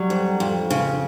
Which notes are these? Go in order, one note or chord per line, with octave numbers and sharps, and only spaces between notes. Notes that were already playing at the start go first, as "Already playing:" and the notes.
Already playing: F#3 G3
F2
F2
C#3